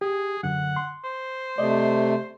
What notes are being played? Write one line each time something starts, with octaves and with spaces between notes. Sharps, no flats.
G4 G#4
F#2 D3 F#5
C6
C5
C3 A3 D5 D#5